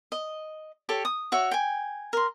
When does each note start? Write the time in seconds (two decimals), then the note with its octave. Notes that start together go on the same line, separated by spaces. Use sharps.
0.12 D#5
0.89 G4 A4 C#5
1.05 D#6
1.32 F#4 C#5 E5
1.51 G5 G#5
2.13 A#4 C6